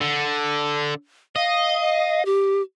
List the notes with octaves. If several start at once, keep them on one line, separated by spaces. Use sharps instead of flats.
D3
D#5 F5
G4